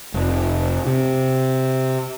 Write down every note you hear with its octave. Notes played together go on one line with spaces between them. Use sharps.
F1
C3